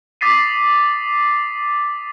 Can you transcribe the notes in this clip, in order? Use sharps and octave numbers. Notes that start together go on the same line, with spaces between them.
D6 D#6 A6 B6 C7 D#7